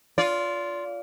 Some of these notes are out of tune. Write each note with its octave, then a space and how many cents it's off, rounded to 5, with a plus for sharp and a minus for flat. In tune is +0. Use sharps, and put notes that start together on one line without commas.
F4 +0 D5 -35